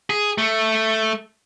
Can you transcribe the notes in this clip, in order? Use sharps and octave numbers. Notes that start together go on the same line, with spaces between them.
G#4
A3